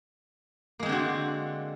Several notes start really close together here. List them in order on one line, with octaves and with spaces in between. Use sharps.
A#3 G#3 C4 D3 F#4